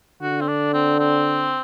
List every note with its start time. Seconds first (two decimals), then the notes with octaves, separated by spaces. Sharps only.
0.22 D3 F#4
0.41 C4
0.48 D4
0.74 C4
0.99 C4